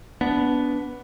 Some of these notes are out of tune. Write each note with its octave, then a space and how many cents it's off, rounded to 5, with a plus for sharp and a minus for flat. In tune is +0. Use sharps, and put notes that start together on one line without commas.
B3 +0 D4 -20